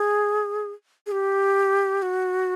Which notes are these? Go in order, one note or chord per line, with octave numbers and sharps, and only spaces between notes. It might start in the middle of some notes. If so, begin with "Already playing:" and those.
Already playing: G#4
G#4
G4
F#4